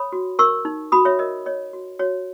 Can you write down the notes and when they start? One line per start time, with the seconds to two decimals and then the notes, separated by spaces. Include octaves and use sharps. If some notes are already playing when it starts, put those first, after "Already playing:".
Already playing: C#5 B5 D#6
0.12 F#4
0.39 A#4 C#6 E6
0.65 D#4
0.92 F#4 B5 D#6
1.05 C#5 E5
1.19 A#4 D#5
1.46 C#5 D#5
1.73 F#4
1.99 F#4 C#5